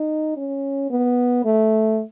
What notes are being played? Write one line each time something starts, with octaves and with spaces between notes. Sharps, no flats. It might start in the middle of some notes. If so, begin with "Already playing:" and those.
Already playing: D#4
C#4
B3
A3